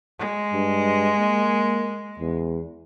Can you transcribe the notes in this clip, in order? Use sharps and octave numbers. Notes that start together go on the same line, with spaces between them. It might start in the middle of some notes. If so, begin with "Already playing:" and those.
G#3
G2
A#3
E2